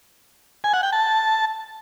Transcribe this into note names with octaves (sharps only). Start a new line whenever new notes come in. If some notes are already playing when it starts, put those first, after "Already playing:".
G#5
F#5
G5
A5